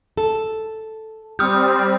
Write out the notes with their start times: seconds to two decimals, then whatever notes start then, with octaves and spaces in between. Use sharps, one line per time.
0.17 A4
1.39 G3 C4 G4 D#6 F6 G6